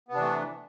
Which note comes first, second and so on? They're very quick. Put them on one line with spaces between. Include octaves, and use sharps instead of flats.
B3 C3 D4 E3 A3